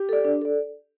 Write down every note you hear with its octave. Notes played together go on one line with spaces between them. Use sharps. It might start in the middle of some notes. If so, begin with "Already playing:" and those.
Already playing: G4
A4 D5
D4
A4 D5